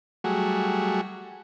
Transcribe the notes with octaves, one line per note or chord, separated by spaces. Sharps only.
F#3 G3 A3 F#4 G#4